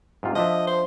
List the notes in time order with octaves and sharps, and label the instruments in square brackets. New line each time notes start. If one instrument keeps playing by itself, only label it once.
[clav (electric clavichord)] G#2 C3 F4
[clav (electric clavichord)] F3 D4 E5 [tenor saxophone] D#5
[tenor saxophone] C5